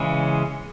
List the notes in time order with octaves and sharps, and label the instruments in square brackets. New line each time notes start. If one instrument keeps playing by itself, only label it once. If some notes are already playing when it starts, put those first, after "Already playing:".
Already playing: [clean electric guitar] C#3 E3 G#3 C#4